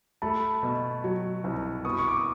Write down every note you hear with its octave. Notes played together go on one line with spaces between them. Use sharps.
A3 A5 B5
B2
F#3
C2
B3 C#6 D#6
C#6
D6
D#6